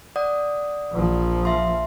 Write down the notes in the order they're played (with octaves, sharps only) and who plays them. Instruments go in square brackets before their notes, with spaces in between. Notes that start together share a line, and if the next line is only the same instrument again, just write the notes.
[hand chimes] D5 F#5 D#6
[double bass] A#1 F3
[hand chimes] E5 F5 C6